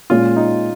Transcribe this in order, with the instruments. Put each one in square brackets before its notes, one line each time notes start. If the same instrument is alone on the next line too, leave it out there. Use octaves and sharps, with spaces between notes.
[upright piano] A#2 G#3 C#4 [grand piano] F4
[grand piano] D#4